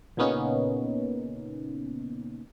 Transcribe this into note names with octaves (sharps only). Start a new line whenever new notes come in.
A#2 C#3 A#3 B3 C#4 D#4